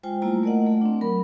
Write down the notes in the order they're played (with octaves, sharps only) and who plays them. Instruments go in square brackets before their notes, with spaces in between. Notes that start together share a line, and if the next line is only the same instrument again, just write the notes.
[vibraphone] G#3 F4 C5 G5 G#5
G3 A3 A#3 E4 F4 A#5
A3 A#4 D5 D#5 F#5
A3
C4 D4
F#3 A#4 B5